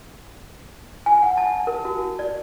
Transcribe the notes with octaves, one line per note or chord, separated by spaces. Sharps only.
G#5
F#5
A5
A#4
F#4
D5